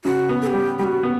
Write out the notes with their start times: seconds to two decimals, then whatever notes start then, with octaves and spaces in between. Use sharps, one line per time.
0.05 C#3 F#4
0.29 B3
0.42 A4
0.47 G4
0.54 G3
0.79 G3 F#4 G4
1.03 B3